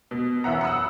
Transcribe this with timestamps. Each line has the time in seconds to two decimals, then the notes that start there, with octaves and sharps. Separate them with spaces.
0.11 B2
0.44 F#2 E3 E5 F#5 A#5
0.61 F#5 B5 D#6 E6